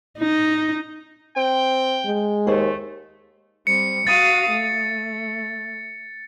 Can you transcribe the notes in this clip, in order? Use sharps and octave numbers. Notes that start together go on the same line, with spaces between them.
D#4
C4 G5
G#3
D#2 A3 G#4 C5
G3 C4 C#7
F#4 F5 D#6 A6
A3